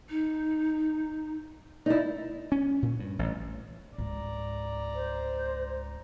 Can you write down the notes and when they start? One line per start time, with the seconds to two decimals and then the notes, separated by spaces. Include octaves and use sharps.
0.10 D#4
1.86 D#4 E4 D5
2.52 C#4
2.82 A#2
3.00 G2
3.19 A1
3.98 C#2 G#2 D5 A#5
4.95 C5